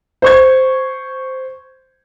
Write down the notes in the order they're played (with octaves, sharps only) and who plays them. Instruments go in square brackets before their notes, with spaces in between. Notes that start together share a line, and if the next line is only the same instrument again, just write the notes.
[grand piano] C5 C#6 G#6